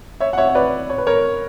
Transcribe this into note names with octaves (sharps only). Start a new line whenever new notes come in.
C#5 E5
F#5
C#5 E5
C#5
B4 D5
C#5
B4
A#4 C#5